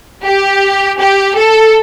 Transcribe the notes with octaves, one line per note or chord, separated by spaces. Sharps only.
G4
G4
A4